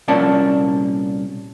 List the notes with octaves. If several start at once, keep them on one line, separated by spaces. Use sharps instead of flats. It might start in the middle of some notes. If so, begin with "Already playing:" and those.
C2 A#2 A#3 C#4 D5 A5